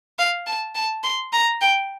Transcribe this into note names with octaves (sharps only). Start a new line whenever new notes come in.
F5
A5
A5
C6
A#5
G5